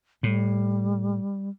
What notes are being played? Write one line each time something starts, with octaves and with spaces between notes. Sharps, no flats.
A2 G3